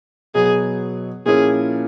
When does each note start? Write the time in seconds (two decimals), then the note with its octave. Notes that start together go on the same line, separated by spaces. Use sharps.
0.35 B2 F#3 B3 G#4
1.26 A#2 F3 A#3 C#4 E4 G#4